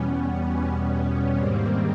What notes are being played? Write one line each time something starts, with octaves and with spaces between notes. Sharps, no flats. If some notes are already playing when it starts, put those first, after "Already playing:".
Already playing: E2 B2 G3 B3 C#4
B3 C#4
G#2 D#3 G3 A#3 C4